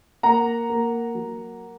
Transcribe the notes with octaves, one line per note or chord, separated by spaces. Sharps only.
A#3 F#5 A#5
A#3
F#3